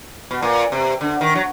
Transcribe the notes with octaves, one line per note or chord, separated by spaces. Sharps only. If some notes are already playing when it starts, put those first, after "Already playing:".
B2
A#2
C3
D3
D#3
F#3